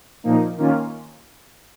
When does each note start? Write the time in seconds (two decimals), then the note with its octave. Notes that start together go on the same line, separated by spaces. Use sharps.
0.23 A#2 F3 A#3 D#4
0.57 D#3 A#3 C#4 F4